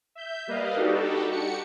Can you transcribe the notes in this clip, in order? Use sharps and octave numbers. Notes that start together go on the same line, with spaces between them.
E5 G6
G3 A#3 B4 D#5 F5
G3 D4 D#4 F#4 G4 A4
F#4 G4 C#7